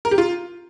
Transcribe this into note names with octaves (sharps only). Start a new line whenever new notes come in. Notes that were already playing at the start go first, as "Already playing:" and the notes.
A#4
G4
F4